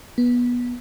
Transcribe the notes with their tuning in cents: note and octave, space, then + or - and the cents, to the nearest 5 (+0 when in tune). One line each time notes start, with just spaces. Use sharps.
B3 -20